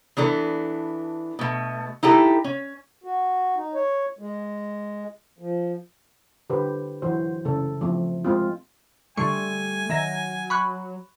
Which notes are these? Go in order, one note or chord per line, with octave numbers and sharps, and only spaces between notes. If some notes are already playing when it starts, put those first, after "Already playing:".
E3 B3 D4 A4
B2 A3
D#4 E4 G4 A4
C#4
F#4
D#4
C#5
G#3
F3
D3 G4 B4 C5
E3 F#3 F#4 C5
C#3 A3 A4
F3 A3 C4
G#3 C4 F4
D3 G3 A3 G#5 C6 C#6
D#3 F#3 E5 A#6
B5 C#6 F#6